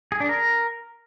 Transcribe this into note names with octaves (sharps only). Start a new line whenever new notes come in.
G#4
D4
A#4